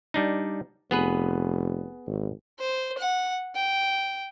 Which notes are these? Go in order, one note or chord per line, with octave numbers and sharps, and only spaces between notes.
G3 D4 D#4
F1 B3 G#4 B4
G#1
C5
F#5
G5